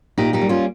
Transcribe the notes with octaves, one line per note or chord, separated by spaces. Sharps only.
A#2 D#4 G4
D#4 G4
G3
C#4 F4